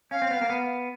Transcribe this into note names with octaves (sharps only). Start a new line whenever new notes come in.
C#4 F5
C4
B3
A#3
B3